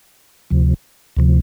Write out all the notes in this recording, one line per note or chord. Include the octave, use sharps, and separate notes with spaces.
D2 C3 F3
D2 C3 F3